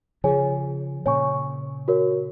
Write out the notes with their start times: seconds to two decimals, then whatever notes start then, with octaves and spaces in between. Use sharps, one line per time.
0.24 C#3 F3 G#4 C#5 G#5
1.06 A#2 C#3 C#5 G#5 C#6
1.88 F#4 A#4 C#5